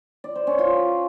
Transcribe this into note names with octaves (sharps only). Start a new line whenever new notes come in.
D5
C5
C#4
F4